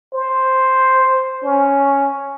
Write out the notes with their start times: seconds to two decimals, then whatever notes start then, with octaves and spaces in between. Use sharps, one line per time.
0.14 C5
1.44 C#4